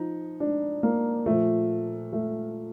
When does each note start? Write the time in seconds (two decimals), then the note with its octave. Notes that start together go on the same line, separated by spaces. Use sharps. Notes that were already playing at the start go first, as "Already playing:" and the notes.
Already playing: F3 D#4
0.40 D4
0.83 A#3
1.26 A#2 F3 A3
2.13 A3